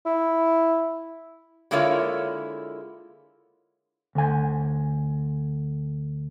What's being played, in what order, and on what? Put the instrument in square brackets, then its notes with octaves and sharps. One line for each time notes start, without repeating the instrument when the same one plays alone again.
[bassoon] E4
[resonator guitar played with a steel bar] D3 G#3 A#3 E4 F4 C#5
[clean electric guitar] D2 G#5